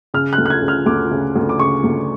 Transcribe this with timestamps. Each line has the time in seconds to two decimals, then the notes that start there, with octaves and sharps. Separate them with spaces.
0.14 C#3 F6
0.33 F#6
0.38 D2
0.46 F#6
0.50 G#6
0.62 C#3
0.68 F6
0.86 D2 D6
1.11 C#3
1.36 D2
1.49 D6
1.59 C#3 C#6
1.84 D2